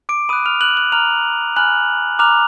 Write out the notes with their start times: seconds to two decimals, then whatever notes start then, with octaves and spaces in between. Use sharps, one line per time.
0.09 D6 D7
0.29 B5 D#6 F#6 D#7
0.46 F6 F7
0.61 F#6 F#7
0.77 F#6 F#7
0.92 A#5 F6 F7
1.56 G#5 B5 F6 F#6 F#7
2.19 A#5 D6 F6 F#6 F7